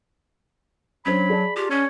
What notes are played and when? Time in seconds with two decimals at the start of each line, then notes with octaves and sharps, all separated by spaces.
1.06 F#3 C#4 D4 C5 B5
1.30 G#4 D5 A5
1.57 F4 G4
1.71 C#4 C#5